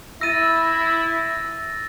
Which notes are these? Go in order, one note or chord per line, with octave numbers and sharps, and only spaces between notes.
E4 E6 A6 A#6 D#7